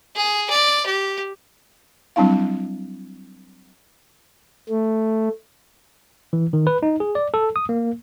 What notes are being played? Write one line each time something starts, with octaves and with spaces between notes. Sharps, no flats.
G#4
D5
G4
F#3 G3 C4 D4 E4 F5
A3
E3
D#3
B4
D#4
G#4
D5
A4
D#6
A#3